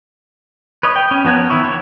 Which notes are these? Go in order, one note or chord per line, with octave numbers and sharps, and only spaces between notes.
B4 C#5 D#5
G5
C#4
F3 B3 A#4 C#5 F#6
D#3 B3 E4 C#6
A#3 C#5 C#6